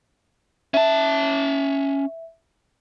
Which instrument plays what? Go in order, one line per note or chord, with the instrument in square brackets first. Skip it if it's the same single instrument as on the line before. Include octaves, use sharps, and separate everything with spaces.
[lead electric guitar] C#4 A5 [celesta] E5